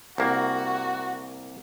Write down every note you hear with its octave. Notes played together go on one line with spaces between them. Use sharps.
C2 A#3 F#4